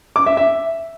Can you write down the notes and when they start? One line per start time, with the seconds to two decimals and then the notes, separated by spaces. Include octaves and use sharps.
0.16 D6
0.26 E5
0.37 E5